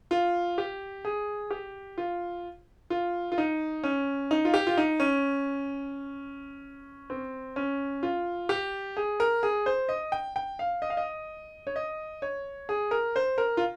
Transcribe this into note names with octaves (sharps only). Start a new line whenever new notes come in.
F4
G4
G#4
G4
F4
F4
F4
D#4
C#4
D#4
F4
G4
F4
D#4
C#4
C4
C#4
F4
G4
G#4
A#4
G#4
C5
D#5
G5
G5
F5
D#5
F5
D#5
C#5
D#5
C#5
G#4
A#4
C5
A#4
F4